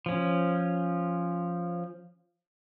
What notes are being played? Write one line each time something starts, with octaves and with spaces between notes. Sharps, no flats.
F3 C#4